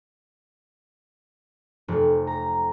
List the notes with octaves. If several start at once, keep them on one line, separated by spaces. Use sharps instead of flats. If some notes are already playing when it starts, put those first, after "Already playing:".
F1
A#5